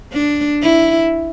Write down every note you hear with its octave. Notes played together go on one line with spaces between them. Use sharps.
D4
E4